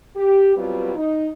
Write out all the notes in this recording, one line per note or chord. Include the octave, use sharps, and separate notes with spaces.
G4
B2 F#3 G3 C4 F4 B4
D#4